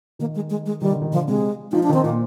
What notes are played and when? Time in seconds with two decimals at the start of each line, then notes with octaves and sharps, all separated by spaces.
0.19 D#3 A#3
0.35 G#3
0.50 G#3
0.66 G#3
0.81 D#3 G3
0.91 D3
1.02 D#3
1.12 D3 F3
1.28 C3 G#3
1.72 F3 D#4
1.83 D4
1.89 D#3 C4
2.04 A#2 A#3